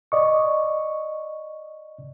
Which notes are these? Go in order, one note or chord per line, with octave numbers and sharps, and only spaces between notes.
D5 D#5 C#6